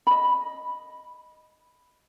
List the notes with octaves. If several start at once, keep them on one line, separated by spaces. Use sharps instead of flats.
D#5 B5